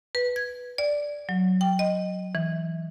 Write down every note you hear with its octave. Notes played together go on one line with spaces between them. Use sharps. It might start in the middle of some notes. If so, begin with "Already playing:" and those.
B4
G#6
D5
F#3
G5
D#5
E3